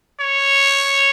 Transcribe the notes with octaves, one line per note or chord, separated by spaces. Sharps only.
C#5